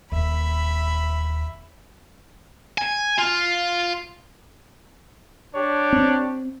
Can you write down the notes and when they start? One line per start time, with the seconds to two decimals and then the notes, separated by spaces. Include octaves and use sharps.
0.12 D#1 D#2 E5 B5
2.78 G#5
3.19 F4
5.54 D4 G4 C#5
5.93 C4